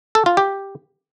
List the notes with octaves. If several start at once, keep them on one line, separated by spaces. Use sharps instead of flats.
A4
F4
G4